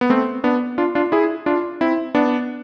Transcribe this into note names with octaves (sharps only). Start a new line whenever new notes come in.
B3
A3 C4
B3 D4
D4 F4
D4 F4
E4 G#4
D4 F4
C4 E4
B3 D4